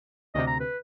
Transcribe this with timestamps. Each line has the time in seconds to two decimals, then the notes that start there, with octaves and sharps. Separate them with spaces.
0.35 D2 C3 D#5
0.47 A#5
0.60 B4